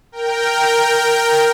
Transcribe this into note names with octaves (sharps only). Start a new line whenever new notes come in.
A#4 G5